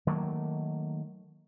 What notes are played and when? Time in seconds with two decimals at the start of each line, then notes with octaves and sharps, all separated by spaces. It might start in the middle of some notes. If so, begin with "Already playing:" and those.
0.07 D#3 F#3 A3 A#3